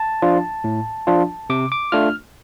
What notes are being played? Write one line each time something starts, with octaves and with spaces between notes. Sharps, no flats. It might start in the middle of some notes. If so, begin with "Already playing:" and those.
Already playing: A5
F3 D4 F4
A2
F3 D4 F4
C3 D6
D6
A3 D4 F4 F6